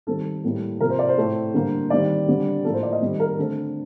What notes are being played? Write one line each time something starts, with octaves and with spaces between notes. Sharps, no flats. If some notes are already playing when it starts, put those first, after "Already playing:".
D#3 G3 C4 A4
A2 G3 A#3
C3 F3 C4 A#4
C5
D5
C5
A2 A3 C4
D3 G3 A#3
D#3 G3 C4 D5
D3 G3 C4
A2 F3 A#3 A4
C5
D5
D#5
D#3 G3 C4
A#4
D3 A3 C4 A4